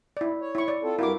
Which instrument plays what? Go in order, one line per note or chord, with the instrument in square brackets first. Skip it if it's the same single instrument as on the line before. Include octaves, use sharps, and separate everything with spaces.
[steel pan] E4 D5
[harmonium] C#5
[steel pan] E4 C#6
D5
[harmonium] C4 F4 A4
[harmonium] G2 A#4 F5 [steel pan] E4 F#4 D6